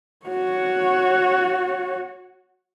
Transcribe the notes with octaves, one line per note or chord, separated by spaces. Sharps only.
F#4 C#5